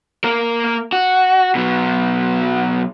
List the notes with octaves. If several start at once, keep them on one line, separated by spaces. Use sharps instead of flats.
A#3 A#4
F#4
B2 F#3